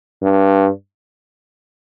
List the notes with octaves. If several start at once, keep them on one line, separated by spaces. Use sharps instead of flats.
G2